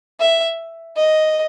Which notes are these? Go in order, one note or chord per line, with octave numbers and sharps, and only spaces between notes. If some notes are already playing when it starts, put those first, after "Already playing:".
E5
D#5